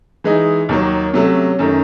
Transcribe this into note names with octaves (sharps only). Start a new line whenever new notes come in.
E3 G#3 D#4
D#2 D#3 F#3
C3 F#3 A3 C#4
F#2 D#3 A3 C#4